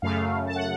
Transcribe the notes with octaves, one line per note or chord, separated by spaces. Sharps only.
F#2 C#3 A3 F5
A5
F#5